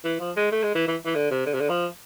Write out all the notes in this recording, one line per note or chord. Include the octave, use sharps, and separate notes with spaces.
E3
F3
G#3
A3
G#3
E3
E3
E3
D3
C3
D3
C3
D3
F3